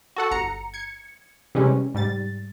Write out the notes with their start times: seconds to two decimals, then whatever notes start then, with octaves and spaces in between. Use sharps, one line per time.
0.16 F#4 A4 F#5
0.31 G1 A#5 C#7
0.74 G#6 C#7
1.55 C3 E3 G3 G#3 C#4
1.94 G#2 G3 A6